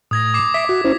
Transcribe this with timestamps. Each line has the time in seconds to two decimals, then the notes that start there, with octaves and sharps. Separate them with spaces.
0.11 A2 D#6 G#6 A#6
0.34 D6 C7
0.54 E5 D6 B6 C7
0.69 F#4
0.84 C#4 E4 C5